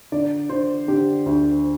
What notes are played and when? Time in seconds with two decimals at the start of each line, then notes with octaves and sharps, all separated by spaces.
0.12 D3 D5
0.49 D3 C5
0.88 D3 G4
1.26 D2